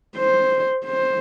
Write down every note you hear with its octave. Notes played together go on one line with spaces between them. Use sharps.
C5
C5